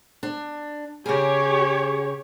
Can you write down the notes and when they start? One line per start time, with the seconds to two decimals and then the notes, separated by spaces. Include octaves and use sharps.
0.23 D4
1.06 C#3 G4 G#4 C#5